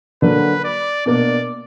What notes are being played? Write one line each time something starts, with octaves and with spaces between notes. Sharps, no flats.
D3 F#3 A#3 B4
D5
B2 A#3 D4 D5